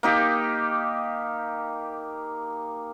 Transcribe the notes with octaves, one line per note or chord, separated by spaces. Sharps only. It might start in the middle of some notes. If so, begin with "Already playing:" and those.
A#3 D#4 G4